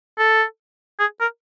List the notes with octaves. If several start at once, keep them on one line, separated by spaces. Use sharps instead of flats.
A4
G#4
A#4